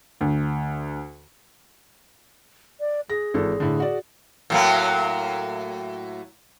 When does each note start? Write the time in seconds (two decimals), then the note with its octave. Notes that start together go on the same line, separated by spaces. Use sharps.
0.21 D2
2.80 D5
3.10 G#4 A#6
3.34 G#1 E3 A4
3.60 A2 D3
3.80 F#4 D5
4.50 A2 F#3 A#3